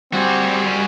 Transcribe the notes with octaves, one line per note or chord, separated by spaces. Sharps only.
G3 C4 F#4 G#4